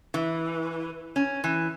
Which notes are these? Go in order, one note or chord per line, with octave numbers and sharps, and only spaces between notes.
E3
C#4
E3